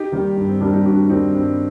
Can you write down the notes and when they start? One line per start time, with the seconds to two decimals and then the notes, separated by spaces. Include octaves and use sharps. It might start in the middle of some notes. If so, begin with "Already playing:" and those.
Already playing: D#4 G4
0.12 D#3 G3 A#3
0.37 G2
0.48 C4
0.60 D#3 G3 A#3 D4
0.74 D#4
0.85 G2 D4 F#4
1.09 D#3 G3 A#3 C4 D#4
1.34 G2 C4